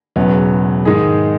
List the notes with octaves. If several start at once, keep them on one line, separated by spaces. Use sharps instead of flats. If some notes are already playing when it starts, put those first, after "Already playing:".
E1 E2 C#3 F#3 B3
G#2 D#3 G#3 D#4 G#4